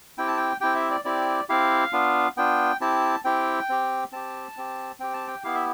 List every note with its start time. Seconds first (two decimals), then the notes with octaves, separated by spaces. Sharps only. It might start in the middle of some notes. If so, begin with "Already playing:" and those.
0.18 C4 E4 G4 G5
0.28 A5
0.37 G5
0.61 C4 E4 G4 G5
0.76 E5
0.91 D5
1.05 C4 E4 G4 D5
1.49 C4 E4 G4 F5
1.93 B3 D4 F4
2.37 B3 D4 F4 G5
2.81 C4 E4 G4 A5
3.24 C4 E4 G4 G5
3.69 C4 G4
4.12 C4 G4 A5
4.57 C4 G4
5.00 C4 G4 G5
5.14 A5
5.27 G5
5.44 B3 E4 G4 F5
5.55 E5